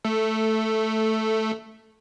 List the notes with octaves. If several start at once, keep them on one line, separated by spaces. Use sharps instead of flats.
A3 A4